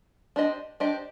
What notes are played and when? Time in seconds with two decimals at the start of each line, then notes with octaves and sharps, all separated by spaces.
0.36 D4 G4 C5 D#5
0.80 D4 G4 C5 D#5